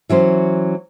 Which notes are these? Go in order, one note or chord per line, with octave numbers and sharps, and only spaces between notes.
E3 F#3 C#4 C5